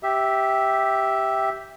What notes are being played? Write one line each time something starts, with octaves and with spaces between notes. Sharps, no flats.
G4 E5